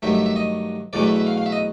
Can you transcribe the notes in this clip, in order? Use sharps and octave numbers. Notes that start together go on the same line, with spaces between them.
G2 D#3 F#3 A3 E5
E5
E5
D#5
E2 B2 F#3 A3 C#4 D5
E5
E5
F5
F5
E5
D#5